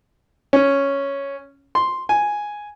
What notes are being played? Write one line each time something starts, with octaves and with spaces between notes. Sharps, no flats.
C#4
C6
G#5